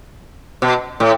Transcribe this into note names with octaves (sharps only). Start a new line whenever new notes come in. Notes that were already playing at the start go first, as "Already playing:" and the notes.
B2
A2